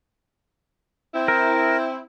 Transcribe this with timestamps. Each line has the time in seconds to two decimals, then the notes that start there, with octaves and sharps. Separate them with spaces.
1.14 C4 E4
1.28 A#4